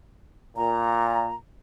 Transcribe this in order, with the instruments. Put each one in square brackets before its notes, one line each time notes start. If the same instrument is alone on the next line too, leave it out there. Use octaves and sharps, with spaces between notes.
[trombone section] A#2 [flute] A#5